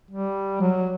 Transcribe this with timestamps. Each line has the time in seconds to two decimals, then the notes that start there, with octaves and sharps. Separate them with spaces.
0.10 G3
0.61 F#3